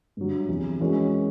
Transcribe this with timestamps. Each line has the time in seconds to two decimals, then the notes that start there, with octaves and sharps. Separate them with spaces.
0.17 G2 D3 F#3
0.48 E2 C3 E3
0.80 E3 G#3 C#4 F#4 A#4